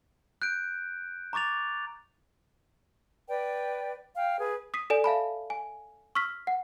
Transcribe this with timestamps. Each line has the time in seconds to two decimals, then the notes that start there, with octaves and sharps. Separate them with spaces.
0.42 F#6 G6 D7
1.33 A#5 C#6 D6 A6 F7
3.28 B4 D5 G5
4.17 F5 G5
4.39 G#4 B4
4.74 D#6 B6 C7 D#7
4.90 A4 D5 G#5
5.04 E5 F5 A5 B5
5.50 G#5
6.15 C#6 E6 F6 B6
6.47 F#5